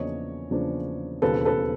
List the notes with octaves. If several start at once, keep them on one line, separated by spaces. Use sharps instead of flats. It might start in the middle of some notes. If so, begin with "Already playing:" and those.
Already playing: E2 C#3 F3 A#3 D4 C#5 D#5
E2 C#3 F3 A#3 D4
E1 D#2 C#3 F3 A4 B4
A4 B4